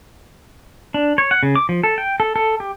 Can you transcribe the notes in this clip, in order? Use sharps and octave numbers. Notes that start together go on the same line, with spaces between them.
D4
C#5
F#5
C#3
D6
F3
A4
G5
A4
A4
G4